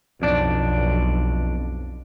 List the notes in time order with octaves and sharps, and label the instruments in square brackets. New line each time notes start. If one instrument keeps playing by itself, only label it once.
[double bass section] B1 [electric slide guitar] F2 D4 D5